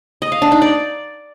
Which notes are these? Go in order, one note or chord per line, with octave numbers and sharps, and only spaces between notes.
D#5
F5
D4
D#4
D5